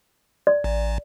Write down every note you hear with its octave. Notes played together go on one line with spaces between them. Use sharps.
D5
A1